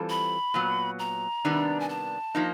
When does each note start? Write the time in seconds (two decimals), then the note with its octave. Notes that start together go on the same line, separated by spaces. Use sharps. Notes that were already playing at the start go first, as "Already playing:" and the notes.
Already playing: E3 G3 C4 F4 A4
0.10 B5
0.54 A#2 F#3 B3
0.99 A#5
1.45 C3 D#3 G3 B3 D4
1.80 G#5
1.89 A5
2.35 F3 A#3 D#4